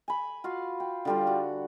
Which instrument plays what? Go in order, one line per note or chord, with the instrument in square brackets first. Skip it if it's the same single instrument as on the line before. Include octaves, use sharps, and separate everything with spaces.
[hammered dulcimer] G#5 B5
F4 F#4 F5
G5
D3 G3 F4
F#4